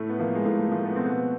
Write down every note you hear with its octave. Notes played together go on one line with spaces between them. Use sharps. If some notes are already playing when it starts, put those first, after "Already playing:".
Already playing: A2 A3
B3
F3 A#3
G#3
A2 A3
A3
F3 A3
B3
B2 C4
B3